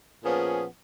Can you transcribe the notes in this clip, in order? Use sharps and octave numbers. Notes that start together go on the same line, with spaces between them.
A#2 F3 B3 C#4 G#4